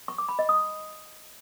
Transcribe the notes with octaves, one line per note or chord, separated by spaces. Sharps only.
C#6
D6
B5
D#5
D#6